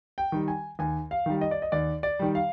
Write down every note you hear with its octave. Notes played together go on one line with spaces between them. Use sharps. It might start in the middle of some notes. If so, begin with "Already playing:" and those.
G5
D#3 G3
G#5
D#2 G#5
F5
D#3 G3
D#5
D5
D#5
D#2 D5
D5
D#3 G3
F5